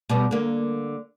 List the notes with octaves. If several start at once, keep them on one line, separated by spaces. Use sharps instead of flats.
B2 G3 B3
D3 A#3